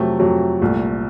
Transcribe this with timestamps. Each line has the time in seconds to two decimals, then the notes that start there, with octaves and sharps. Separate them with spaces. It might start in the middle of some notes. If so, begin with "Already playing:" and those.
Already playing: F2 C3 F#3 A3
0.19 F2 C3 F#3 A3
0.61 C2 A#2 A3